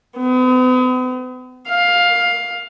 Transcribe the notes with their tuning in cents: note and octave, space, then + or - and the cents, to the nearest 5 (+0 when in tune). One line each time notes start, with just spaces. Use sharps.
B3 +45
F5 +15